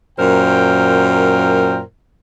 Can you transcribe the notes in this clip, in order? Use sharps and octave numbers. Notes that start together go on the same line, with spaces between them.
F#2 A#2 A#4 C5 G5